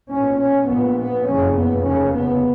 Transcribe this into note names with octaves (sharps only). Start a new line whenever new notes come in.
B1 A#2 C#4
C#4
A#1 A#2 B3
B3
F#1 F2 C#3 C#4
B3
F1 D#2 C#3 C#4
B3